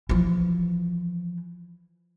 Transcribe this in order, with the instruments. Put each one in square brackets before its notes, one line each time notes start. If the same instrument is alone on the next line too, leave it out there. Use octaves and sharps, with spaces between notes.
[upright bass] E3 F3